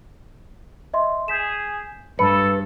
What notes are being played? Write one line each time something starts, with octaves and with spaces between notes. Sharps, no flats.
D#5 E5 C6
G#4 G6 B6 E7
G2 A4 B4 C#7